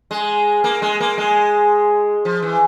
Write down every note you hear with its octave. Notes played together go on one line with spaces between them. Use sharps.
G#3
A#3
G#3
A#3
G#3
F3
E3